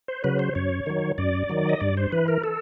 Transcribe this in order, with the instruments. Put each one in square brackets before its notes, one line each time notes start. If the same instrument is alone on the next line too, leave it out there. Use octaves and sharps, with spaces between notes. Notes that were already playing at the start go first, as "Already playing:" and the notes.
[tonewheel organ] C5
C#3 F#3 B4
C5
F#2 C#5
D#3 F#3
F#2 D5
D#3 F#3
D#5
G2 D5
C5
E3 B4
A#4
A4